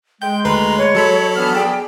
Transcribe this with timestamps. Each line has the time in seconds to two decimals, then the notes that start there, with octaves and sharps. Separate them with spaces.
0.22 G#3 G5 G6
0.45 D2 B4 A#5 C6
0.78 C#5
0.95 F#3 A4 B5
1.36 G2 E3 B3 F6
1.55 G#4 D5 G5